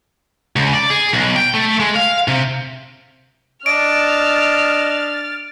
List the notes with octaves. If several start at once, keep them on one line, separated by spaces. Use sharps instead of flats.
C#2
D5
G#4
B1
G5
A3
G#3
F5
C3
D4 D#5 F6 A6 D7